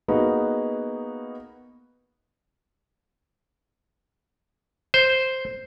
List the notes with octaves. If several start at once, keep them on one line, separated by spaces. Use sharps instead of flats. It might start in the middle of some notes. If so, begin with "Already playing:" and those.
A#3 B3 D#4 F#4 G#4 B4
C5